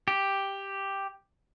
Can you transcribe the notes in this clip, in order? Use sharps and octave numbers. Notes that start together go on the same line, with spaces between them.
G4